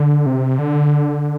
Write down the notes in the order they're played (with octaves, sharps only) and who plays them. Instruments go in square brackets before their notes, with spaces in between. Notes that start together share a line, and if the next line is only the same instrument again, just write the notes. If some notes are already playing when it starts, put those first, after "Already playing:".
Already playing: [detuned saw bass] D3
C3
D3